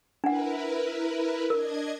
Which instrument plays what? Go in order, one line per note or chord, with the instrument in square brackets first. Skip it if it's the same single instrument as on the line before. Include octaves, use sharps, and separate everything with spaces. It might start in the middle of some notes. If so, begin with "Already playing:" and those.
[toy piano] D4 F#5 [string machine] E4 A#4 B4
[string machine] D4 D#5 G#6 [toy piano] A#4